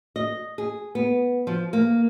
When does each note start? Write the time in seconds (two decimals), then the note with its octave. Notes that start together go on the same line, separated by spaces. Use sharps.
0.16 D#5
0.58 G#4
0.95 B3
1.47 F3
1.73 A#3